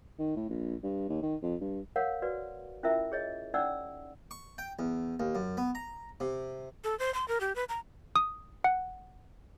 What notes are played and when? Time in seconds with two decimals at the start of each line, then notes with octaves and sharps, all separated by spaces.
0.19 D#3
0.36 A2
0.49 A#1
0.83 G2
1.09 D#2
1.22 D#3
1.42 F2
1.61 G2
1.96 A#4 C#5 F5 F#5
2.22 F#4 B4 D5
2.83 C#4 E4 F4 A#4 E5
3.12 G#4 C#5 D#5
3.54 C#4 D#4 D5 F#5 E6
4.31 C#6
4.58 G5
4.79 E2
5.20 D#2
5.35 F#2
5.57 B3
5.75 A#5
6.20 C3
6.84 A4
6.99 C5
7.14 C6
7.28 A#4
7.40 G4
7.56 B4
7.69 A#5
8.16 D#6
8.64 F#5